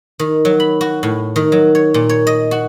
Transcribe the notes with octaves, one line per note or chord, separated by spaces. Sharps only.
D#3
F#3
B5
F#4
A2
D#3
F#3
C#5
A#2
C#5
D#5
F#4